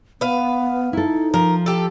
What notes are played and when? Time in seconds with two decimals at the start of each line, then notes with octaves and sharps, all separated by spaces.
0.21 B3 B4 F5
0.93 D#4 E4 A4
1.34 F3 A#4
1.66 G4 A4